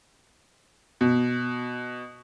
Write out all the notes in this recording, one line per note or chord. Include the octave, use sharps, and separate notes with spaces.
B2